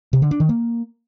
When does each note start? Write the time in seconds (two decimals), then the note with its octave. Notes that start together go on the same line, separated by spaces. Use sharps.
0.13 C3
0.22 D3
0.31 D4
0.40 D#3
0.49 A#3